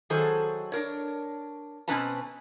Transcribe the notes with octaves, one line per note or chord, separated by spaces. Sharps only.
D#3 F#3 G#4 A4 C5
D4 A#4 C#5
B2 C4 C#4 B4 A5 A#5